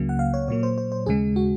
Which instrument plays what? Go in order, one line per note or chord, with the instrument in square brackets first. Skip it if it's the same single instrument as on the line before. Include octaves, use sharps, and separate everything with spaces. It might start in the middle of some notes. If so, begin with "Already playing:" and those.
Already playing: [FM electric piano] C#2 C#3 F#3 A#3
F#5
F5
C#5
A#2 F#3 A#3 C#5
C5
C5
C5
D#2 C#3 G#3 G#4
F#4